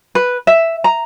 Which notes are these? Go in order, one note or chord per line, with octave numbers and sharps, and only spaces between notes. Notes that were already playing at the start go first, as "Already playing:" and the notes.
B4
E5
A#5